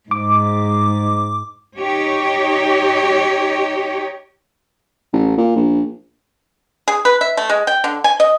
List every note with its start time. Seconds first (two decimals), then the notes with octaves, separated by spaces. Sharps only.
0.11 G#2 D6
1.77 D#4 G4 C#5
5.13 A1
5.37 A#2
5.56 A#1
6.88 G#4
7.05 B4
7.21 E5
7.37 A3
7.49 G#3
7.67 G5
7.84 D3
8.04 G#5
8.20 D#5